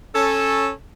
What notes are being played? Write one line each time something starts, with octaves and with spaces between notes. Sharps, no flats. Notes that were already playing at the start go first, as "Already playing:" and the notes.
C#4 A4